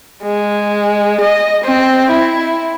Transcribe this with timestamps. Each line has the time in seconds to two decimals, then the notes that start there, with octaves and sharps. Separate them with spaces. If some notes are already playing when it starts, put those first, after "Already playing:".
0.23 G#3
1.20 D#5
1.64 C4
2.11 E4